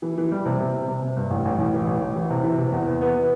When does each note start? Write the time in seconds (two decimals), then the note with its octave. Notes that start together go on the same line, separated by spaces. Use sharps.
0.02 E3
0.18 E3
0.32 G3
0.46 C3
0.59 C3
0.73 C3
0.88 C3
1.02 C3
1.16 G2
1.30 A1
1.45 A1
1.58 A1
1.74 E3
1.87 A1
2.01 A1
2.16 E3
2.30 C3
2.44 E3
2.57 C3
2.73 E2
2.86 B3
3.01 B3
3.15 E3